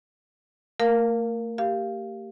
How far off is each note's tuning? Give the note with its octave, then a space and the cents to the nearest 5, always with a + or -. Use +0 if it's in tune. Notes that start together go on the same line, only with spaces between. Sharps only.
A3 +40 A#4 +0 F5 +0
G4 +0 F5 -10